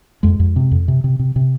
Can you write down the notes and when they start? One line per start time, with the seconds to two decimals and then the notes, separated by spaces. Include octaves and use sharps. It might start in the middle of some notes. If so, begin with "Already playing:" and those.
0.23 F2 G#3
0.40 F2
0.56 C3
0.71 F2
0.88 C3
1.04 C3
1.19 C3
1.36 C3